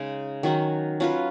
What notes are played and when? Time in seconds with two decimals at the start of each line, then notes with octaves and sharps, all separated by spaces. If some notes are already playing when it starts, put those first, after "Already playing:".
Already playing: C#3 G#3 D#4
0.43 D#3 F#3 C#4 F#4
1.00 F#3 C#4 F4 B4